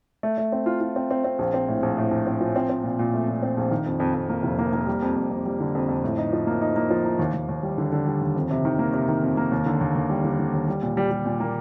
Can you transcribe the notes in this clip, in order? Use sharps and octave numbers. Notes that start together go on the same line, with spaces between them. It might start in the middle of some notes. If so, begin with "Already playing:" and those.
A3
A3
C4
F4
F4
C4
C4
C4
A#1
C4
A2
A#1
A2
A#1
C4
F3
C4
C4
A#2
A#2
A3
A#2
C4
A#1
D#3
F2
F2
F2
A#3
F1
A#3
A#3
G3
F2
F2
F2
G3
D3
F2
F2
A2
D#4
F3
A#3
D#4
A#3
F3
D#4
D#2
D#2
D#2
G3
D3
D3
G3
D#2
F2
C3
D#3
A#3
C3
D#3
F2
A#3
D#2
D3
D#2
D#2
G3
D3
D3
D#2
G3
A#2
G3
G3
A#2
A#3